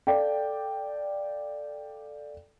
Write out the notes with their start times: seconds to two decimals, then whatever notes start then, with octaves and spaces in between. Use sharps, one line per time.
0.07 A4 D5 F5 G5